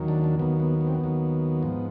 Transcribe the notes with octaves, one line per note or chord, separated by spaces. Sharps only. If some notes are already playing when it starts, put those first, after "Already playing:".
Already playing: D#2 D#3 F#3
D4
D4
D#2 D#3 F#3 B3
B3
B3
C4
B3
D#2 D#3 F#3
G#2 F3